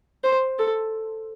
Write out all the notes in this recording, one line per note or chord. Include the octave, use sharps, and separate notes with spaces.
C5
A4